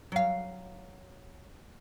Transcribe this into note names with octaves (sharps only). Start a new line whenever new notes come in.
F#3 F5